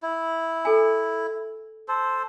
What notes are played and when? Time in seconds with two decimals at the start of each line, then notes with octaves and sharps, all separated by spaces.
0.03 E4
0.65 A4 G#5
1.88 A4 C5